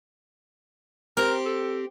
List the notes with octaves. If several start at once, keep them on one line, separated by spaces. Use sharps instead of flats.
C4 G4 A#4
A4